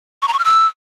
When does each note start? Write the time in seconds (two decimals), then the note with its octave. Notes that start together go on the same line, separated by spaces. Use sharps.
0.22 C#6
0.28 A#5
0.33 C#6
0.39 F6
0.44 E6